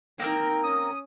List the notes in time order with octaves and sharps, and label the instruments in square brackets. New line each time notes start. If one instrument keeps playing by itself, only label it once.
[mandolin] A#3 C4 A#4 [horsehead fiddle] D#4 G5
[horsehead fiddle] C#4 [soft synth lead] D#6